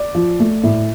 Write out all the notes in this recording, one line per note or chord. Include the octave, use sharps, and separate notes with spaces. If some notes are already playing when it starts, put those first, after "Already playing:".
Already playing: D5
F3
A3
A2